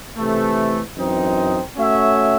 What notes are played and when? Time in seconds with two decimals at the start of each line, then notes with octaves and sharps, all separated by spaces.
0.17 C3 E3 A3
0.95 F#2 E3 C4 D#4
1.76 A3 C#4 F#4 C#5 E5